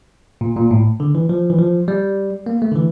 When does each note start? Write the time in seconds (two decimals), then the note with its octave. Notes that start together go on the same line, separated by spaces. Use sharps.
0.41 A#2
0.57 A#2
0.71 A2
1.00 D3
1.15 E3
1.29 F3
1.50 E3
1.59 F3
1.88 G3
2.46 A#3
2.62 A3
2.71 D3
2.76 E3